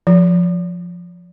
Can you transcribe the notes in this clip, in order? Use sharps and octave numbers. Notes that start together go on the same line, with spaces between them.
F3